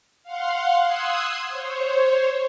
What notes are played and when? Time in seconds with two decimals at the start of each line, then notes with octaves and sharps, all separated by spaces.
0.23 F5 F#5 C6
0.86 C6 D#6 E6 F#6 G#6
1.48 C5 C#5